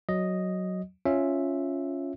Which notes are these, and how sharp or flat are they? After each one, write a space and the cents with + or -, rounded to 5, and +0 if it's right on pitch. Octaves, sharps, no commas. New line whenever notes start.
F#3 +0 D#5 +0
C#4 +0 F4 +0 E5 +0